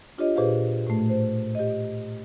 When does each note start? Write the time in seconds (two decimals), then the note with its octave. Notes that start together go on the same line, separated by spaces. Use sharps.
0.18 D4 F4 G4 C#5 D#5
0.36 A#2 G4 G#4 B4 C5 F5
0.87 A2 A3
1.10 C5
1.55 G4 D#5